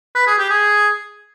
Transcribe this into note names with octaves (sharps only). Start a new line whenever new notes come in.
B4
G#4
G4
G#4